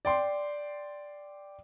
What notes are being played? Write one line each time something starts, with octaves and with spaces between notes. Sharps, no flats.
D5 G5 C6